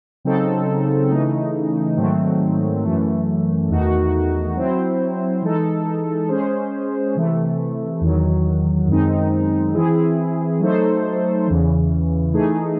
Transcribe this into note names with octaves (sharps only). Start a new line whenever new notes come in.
C#3 F#3 C4 D#4 A4
C#3 E3 A3 D#4
G#2 D#3 F#3 A3 C4
F#2 E3 A3
E2 D#3 A3 D#4 F#4
F#3 C4 E4 C5
E3 G#3 D#4 A4
G#3 C#4 G#4 C5
C3 E3 A3
E2 D#3 F#3
F#2 D#3 G#3 C4 D#4
E3 C4 E4 G#4
F#3 A3 D#4 A4 C5
E2 C#3 E3
E3 A3 D#4 G#4